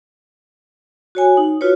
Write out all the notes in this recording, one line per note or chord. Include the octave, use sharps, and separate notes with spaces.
F#4 C#5 G#5
D#4
F4 F#4 B4 C#5